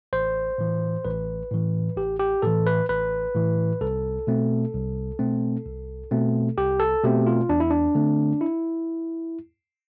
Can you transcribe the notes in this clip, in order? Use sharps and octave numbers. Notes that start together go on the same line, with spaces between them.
A1 C5
A2 E3
A1 B4
A2 E3
A1 G4
G4
A2 E3 A4
B4
A1 B4
A2 E3
C2 A4
B2 A3 C4
C2
B2 A3 C4
C2
B2 A3 C4
C2 G4
A4
B2 A3 C4 G4
F4
E2 D4
E4
D4
D3 A3 C4
E4